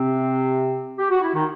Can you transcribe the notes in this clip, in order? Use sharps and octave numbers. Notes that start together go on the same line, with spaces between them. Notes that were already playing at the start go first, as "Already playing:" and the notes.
Already playing: C3 C4
G4
F#4
E4
D#3 D#4